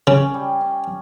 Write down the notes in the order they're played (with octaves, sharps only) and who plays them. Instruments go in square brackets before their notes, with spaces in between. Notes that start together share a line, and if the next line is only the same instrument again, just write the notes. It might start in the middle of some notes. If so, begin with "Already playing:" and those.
[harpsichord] C#3 [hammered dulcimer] C#4
[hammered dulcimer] G3
C#4